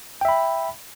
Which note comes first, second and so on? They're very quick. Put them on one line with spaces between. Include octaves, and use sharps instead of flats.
G5 E5 B5